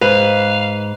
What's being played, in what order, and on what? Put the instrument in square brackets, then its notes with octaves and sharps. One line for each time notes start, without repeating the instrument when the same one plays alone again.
[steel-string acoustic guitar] G#2 [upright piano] B4 [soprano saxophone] F5